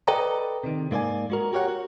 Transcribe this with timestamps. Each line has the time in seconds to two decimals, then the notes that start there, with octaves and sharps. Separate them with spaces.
0.08 A4 B4 D5 D#5 G5 A#5
0.64 C3 D#3
0.91 G#2 A#3 E4 D5 G#5
1.30 G#3 F#4 A#4
1.53 F#4 G4 A#4 C#5 F#5
1.68 F#4